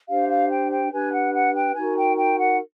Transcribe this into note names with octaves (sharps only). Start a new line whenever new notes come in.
D4 G4 C5 F5
F5
G5
G5
D4 G4 B4 G#5
F#5
F#5
G5
D#4 F#4 A#4 G#5
G5
G5
F#5